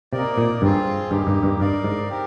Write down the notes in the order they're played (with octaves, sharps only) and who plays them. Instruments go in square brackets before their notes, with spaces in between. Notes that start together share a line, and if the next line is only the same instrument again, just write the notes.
[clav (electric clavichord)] C3 [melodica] A#3 D#4 A#4 D5
[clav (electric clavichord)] A#2
[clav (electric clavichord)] G2 [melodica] C4 F4 G#4
[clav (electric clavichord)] G2 [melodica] A#3 D#4 G4
[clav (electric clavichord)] G2
G2
[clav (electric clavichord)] G2 [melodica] D#4 A#4 D5 F5
[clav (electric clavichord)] G#2
[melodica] C4 G4 A#4